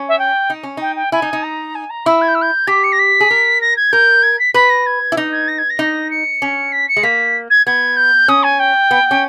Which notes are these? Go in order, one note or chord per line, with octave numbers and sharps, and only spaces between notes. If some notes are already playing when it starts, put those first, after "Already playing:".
Already playing: C#4
E5
G5
D#4
C#4
D#4 G5
G5
E4 G#5
D#4
D#4
A#5
G#5
A#5
E4 E6
G#6
G6
E6
G6
G4 B6
C#7
A#6
B6
G#4
A#4
A#6
G#6
A#4 G6
G#6
B6
B4 B6
A#6
G#6
E4
D#4
G#6
A#6
G#6
A#6
D#4
C#7
C#4
B6
C#7
G#3
A#3 B6
G#6
B3 G#6
G6
C#4 D#6
G#5
G5
B3
C#4